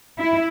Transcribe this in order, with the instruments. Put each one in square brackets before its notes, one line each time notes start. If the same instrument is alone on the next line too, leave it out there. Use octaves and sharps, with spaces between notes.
[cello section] E4